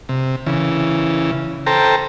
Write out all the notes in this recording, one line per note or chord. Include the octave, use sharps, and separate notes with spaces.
C3
C#3 E3
A4 C5 G5 A#5